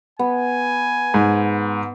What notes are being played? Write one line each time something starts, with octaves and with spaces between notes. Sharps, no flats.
B3 G#5
G#2